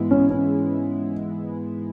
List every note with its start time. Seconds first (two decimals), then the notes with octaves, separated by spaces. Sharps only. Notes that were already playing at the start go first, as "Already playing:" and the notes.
Already playing: G#2 E3 G#3 B3 E4
0.11 C#4
0.30 C#4